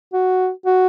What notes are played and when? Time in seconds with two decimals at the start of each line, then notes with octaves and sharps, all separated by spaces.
0.13 F#4
0.66 F#4